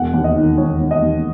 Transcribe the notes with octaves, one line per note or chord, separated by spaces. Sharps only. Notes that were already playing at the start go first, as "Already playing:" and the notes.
Already playing: E1 F#5
D#2
D#5
D#3
E1 C#5
E1
D#5
D#2